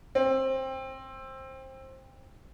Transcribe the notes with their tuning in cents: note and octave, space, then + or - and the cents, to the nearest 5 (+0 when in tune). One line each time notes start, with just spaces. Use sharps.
C4 +20